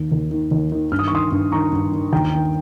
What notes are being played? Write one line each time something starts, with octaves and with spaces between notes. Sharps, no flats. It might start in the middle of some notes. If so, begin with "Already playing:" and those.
Already playing: D#2 D#3
D#2
D#3
D#2
D#3
G2 F6
D#6
C#6
D#3 C6 D#6
G2
D#3 A#5 C#6
G2
D#3
D#2 G5 A#5
D#3